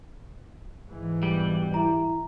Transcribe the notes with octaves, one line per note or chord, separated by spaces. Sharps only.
G#2 E3
B2 G3
E4 A#5